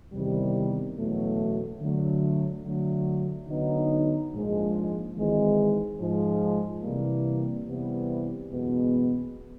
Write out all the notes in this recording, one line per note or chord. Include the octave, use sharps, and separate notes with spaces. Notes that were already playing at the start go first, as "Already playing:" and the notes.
E2 C3 D#3 G3
F#1 E2 B2 F#3 A3
D3 F#3 A3
D3 F#3 A3
D2 D3 F#3 B3 D#4
A#1 G#2 F3 G#3
G#1 G#2 E3 G#3
G#2 F3 G#3
C3 E3 G3 A#3
E2 C3 E3 G3 B3
F#1 E2 B2 G#3 B3